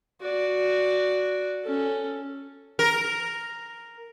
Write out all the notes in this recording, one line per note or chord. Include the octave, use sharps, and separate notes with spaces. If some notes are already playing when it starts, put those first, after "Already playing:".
F#4 D5
C#4 A4
A#4